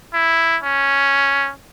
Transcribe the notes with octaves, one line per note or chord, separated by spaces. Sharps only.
E4
C#4